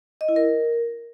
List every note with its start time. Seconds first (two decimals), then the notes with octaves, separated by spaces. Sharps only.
0.21 D#5
0.29 E4
0.36 A#4